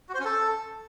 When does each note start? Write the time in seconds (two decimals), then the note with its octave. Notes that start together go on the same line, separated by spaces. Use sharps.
0.09 F#4
0.14 C5
0.20 C#4
0.25 A4